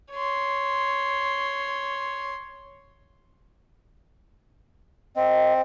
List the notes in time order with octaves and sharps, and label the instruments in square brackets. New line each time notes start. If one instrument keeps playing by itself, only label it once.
[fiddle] C#5 C6
[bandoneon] C4 [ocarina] D#5